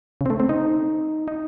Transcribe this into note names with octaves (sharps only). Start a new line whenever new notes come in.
C#3
C4
A3
C4
D#4
D#4